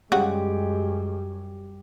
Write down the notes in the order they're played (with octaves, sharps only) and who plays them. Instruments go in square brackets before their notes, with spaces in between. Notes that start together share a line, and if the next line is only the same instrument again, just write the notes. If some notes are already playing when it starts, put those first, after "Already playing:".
[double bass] F#2 [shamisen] C#3 F#4 [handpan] G3 G4 [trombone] G#3